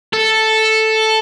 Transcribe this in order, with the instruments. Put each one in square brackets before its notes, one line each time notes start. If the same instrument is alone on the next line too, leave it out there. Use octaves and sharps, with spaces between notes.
[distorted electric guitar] A4